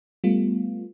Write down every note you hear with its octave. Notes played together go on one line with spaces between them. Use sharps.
G3 A3 B3 F4